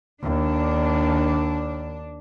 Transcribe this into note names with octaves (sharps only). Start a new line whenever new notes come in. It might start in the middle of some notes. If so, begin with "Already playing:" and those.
D#2 D4